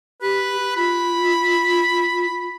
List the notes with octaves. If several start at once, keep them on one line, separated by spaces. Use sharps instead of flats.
G4 B4
F4 B5